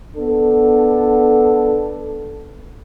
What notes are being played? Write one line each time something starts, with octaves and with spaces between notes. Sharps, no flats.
B3 D4 A4